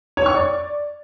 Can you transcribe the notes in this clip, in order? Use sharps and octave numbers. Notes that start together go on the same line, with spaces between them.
C#5
C#6
D5